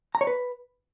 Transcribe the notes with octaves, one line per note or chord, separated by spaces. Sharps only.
A#5
C#5
B4